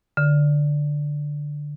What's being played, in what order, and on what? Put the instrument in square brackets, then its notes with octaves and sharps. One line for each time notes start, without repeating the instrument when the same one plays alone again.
[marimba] D3